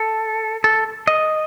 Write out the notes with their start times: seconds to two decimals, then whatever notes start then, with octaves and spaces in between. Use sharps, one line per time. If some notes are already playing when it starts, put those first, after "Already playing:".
Already playing: A4
0.64 A4
1.07 D#5